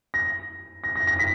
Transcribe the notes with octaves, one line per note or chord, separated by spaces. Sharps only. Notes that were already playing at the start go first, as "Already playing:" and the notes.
A#6
A#6
A#6
A#6
B6